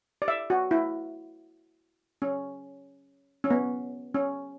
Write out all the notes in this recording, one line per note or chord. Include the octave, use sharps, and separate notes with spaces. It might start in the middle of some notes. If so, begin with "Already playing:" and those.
D5
E5
F#4
E4
C#4
C#4
B3
C#4